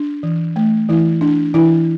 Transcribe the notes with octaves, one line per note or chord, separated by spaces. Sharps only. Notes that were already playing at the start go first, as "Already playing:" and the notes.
Already playing: D4
E3
A3
E3 E4
D4
E3 E4